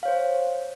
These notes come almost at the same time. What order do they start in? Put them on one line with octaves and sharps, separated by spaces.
F5 C#5 C5